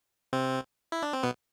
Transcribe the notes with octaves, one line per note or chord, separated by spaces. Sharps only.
C3 C4
E4
D4
C4
B2 B3